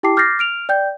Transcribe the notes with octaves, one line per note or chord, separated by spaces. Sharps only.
E4 G4 G5 A5 D6 C7
D6 F6 G6 A6 A#6 C7
F6 D7 F7
D5 G5 G6